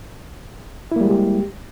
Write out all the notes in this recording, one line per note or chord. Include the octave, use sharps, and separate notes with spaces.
G3 G#3 A#3 E4 G4